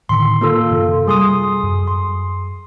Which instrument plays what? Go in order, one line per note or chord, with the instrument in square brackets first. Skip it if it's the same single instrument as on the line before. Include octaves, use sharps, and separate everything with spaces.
[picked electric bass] A2 D3 D#3 [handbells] C6
[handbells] A#3 F4 A4
[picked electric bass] F#2 C3
[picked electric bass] G3 [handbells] G#4 C6 D#6
[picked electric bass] F#2
[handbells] C6